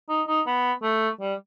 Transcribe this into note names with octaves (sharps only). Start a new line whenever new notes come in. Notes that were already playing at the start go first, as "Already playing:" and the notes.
D#4
D#4
B3
A3
G3